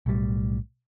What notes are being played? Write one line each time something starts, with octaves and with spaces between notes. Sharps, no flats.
B1 A2 G3